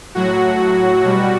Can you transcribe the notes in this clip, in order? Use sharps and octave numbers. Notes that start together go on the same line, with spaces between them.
A2 F#3 F#4
B2 G3